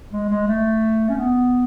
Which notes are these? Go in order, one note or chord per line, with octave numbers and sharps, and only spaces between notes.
G#3
G#3
A3
C#4
B3